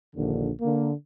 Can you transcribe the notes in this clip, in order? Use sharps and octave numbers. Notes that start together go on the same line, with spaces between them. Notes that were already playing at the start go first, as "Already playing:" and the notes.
A#1 D#2 D3
D3 A#3